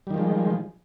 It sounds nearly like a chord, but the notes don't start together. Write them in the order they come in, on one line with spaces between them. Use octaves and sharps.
G3 D#3 F3 G#3